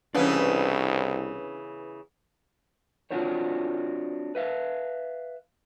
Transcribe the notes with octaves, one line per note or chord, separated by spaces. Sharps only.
C2 C#3 E3 B3 C#4 D4
C4 D4 F4 F#4 C5 C#5
B4 E5 F5